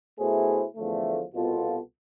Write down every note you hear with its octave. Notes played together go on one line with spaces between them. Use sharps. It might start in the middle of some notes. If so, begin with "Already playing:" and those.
B2 A3 E4 G#4 C5
E2 D3 F3 A3
C2 B2 B3 F4 A4